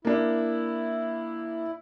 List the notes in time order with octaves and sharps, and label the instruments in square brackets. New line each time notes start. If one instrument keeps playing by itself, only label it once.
[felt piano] A#3 D4 [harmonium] E4